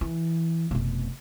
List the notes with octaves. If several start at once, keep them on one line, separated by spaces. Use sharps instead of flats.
E3
F1 B2